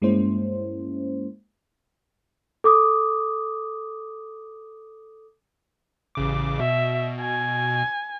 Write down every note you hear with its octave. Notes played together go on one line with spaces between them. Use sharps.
G2 G#3 A#3 C#4 E4 C5
A4 D6 D#6
A1 C#3 D6
B2 E5
G#5